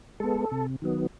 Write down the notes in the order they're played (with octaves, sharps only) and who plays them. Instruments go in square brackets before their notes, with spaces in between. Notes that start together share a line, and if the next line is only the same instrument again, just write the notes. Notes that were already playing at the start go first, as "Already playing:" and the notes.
[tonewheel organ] G#3 B3 A4
C3
D#3 F#3 B3